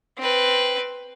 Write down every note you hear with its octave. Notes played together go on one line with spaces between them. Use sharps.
C4 B4